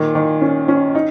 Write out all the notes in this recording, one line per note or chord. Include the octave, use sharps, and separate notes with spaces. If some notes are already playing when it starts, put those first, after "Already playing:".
Already playing: A#2 D#3
D#3
C#4
C#4
D#4